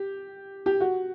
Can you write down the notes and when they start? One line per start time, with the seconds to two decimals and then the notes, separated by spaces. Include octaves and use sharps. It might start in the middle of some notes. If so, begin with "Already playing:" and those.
Already playing: G4
0.66 G4
0.80 F#4